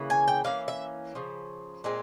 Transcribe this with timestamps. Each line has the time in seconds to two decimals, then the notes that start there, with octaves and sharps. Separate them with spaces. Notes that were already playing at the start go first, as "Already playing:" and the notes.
Already playing: C#3 E3 A#3
0.10 G#5
0.28 G5
0.44 E3 A#3 C#4 F5
0.68 E5
1.15 C#3 F3
1.84 A#2 G#3 C4